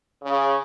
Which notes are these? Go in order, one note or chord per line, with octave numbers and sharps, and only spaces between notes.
C#3